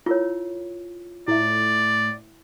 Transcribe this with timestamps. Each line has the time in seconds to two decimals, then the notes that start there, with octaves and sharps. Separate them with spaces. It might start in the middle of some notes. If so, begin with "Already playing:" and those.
0.06 E4 F4 A#4 C#5
1.28 A2 E4 D5 E5